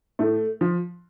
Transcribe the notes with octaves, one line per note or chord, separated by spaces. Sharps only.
A2 A3
F3